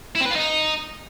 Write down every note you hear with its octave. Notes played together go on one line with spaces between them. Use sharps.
E4
C4
B4
F4
D#4